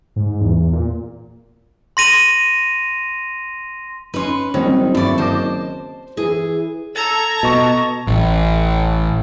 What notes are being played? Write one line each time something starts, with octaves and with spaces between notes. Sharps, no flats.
G#2
E2
A#2
C6 A#6 D#7 F7
C#4 D#4 B4 C6
F#1 D#3 G3 C4 C#4 F#4
G2 E4 D5 C#6
D#3 C5 D#5 A5 D6
E3 G#4
A4 A#5 E6 G#6
B2 D#5 C#6
A1